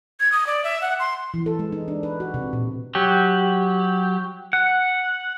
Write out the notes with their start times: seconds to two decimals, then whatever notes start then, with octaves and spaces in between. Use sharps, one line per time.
0.20 G#6
0.32 D#6
0.47 D5
0.64 E5
0.81 F#5
0.99 C6
1.34 E3
1.46 A4
1.59 G#3
1.72 D#4
1.88 D4
2.03 B4
2.20 F#4
2.34 C3
2.53 A#2
2.95 F#3 G4
4.53 F#5